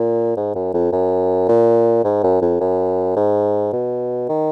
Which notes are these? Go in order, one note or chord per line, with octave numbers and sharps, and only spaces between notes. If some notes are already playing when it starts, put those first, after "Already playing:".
Already playing: A#2
G#2
F#2
F2
F#2
A#2
G#2
F#2
F2
F#2
G#2
B2
D#3